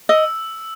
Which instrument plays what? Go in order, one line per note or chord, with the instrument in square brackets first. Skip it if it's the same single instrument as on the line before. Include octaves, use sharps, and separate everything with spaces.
[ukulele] D#5 [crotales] E6